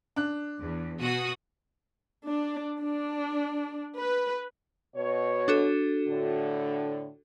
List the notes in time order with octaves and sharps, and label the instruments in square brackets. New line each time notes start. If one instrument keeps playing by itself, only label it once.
[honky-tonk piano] D4 F#6
[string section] E2
B2 F#4 D#6
[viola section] D4
D4
B4
[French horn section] B2 C#5
[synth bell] D4 F#4 A4
[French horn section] A2 D3